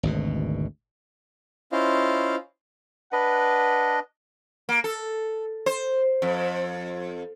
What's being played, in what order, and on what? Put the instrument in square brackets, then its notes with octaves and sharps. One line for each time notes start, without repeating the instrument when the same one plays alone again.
[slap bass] G#1 D2 B2
[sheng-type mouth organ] C#4 E4 F4 C5 D#5 F5
[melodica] D4 D#5 [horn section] B4 F#5
[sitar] A#3
A4
C5
F2